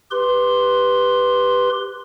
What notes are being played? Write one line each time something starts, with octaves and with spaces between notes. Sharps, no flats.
G4 B4 C6